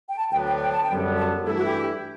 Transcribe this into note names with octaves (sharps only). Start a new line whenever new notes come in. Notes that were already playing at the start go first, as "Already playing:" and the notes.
G5
A5
D2 D3 F#3 B3 D4 G5
G5
G5
A5
G5
F#2 D3 G3 B3
A5
G2 E3 A3 E4 A4
F#4
G4